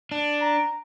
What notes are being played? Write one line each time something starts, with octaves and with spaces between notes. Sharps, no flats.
D4
A#5